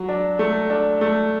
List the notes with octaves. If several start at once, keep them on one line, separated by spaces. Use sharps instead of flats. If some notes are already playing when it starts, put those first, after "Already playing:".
Already playing: F#3
D4
A3
D4
A3